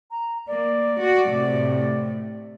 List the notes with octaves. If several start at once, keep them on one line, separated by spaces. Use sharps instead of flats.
A#5
A#3 D5
F#4
A2 C3 A3